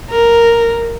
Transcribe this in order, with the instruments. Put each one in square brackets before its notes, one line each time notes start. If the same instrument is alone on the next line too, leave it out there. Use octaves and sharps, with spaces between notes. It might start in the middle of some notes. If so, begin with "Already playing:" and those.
[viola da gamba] A#4